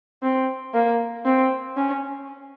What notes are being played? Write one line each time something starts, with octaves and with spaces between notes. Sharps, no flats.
C4
A#3
C4
C#4